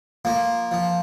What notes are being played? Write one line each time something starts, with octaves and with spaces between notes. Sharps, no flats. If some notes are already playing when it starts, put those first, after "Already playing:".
F3 A#3
F3